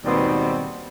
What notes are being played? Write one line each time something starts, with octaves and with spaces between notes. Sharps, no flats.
D#2 G#2 B2 G3 B3 C4